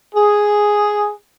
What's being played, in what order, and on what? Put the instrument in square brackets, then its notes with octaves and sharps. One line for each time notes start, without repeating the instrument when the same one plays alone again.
[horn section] G#4